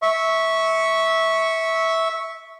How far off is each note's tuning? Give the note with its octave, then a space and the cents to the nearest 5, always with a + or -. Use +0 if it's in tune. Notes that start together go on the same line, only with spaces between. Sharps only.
E5 -15 C#6 +0